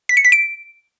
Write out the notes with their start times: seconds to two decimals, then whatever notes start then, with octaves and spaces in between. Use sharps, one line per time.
0.09 B6
0.17 C#7
0.25 B6
0.32 D7